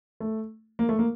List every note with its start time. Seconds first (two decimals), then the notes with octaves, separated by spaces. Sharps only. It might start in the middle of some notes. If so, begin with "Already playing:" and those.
0.20 A3
0.79 A#3
0.89 A3
0.99 A#3